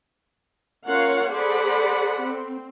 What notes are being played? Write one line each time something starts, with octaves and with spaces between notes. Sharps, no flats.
C#4 F4 A#4 C#5 F5 F#5
G#4 A4 C5 D5 F#5 B5
C4